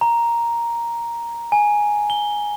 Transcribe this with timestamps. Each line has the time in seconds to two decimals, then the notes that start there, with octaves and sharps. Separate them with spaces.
0.01 A#5
1.52 G#5
2.10 G7